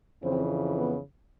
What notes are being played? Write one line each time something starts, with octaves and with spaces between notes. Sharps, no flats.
F2 C#3 E3 C4
B3